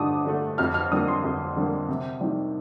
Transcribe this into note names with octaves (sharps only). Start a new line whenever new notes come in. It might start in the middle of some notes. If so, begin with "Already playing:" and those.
Already playing: G2 D3 A3 A5 D6 D#6
D3 A3
F2 F6
F6
D3 G3 A#3 D#6
C6
F2
D3 G3 A#3
C3
D#3 G3